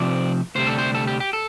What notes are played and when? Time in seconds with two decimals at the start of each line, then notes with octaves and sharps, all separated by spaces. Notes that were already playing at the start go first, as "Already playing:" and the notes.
Already playing: C3 F3 C4 D5
0.55 D2 C3 G3 C5
0.67 A4
0.78 C5
0.95 A4
1.07 G4
1.20 G4
1.33 A4